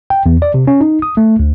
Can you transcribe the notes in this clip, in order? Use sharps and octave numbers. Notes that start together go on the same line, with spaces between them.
G5
E2
D5
C3
C#4
D#4
D#6
A3
D2